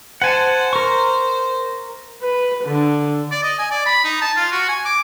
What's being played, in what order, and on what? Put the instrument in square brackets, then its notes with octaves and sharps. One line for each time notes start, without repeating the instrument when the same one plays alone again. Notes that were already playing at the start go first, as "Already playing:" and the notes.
[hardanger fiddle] C5 [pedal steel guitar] F#5 G#5 A5
[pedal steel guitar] A#4 C#6
[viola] B4
D3
[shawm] D5
D#5
G#5
D5
B5
D#4
A5
F4
F#4
G#5
D6